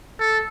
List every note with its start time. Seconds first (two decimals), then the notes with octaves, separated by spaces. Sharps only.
0.20 A4